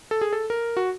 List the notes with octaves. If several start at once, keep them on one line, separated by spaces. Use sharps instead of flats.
A4
G#4
A4
A#4
F#4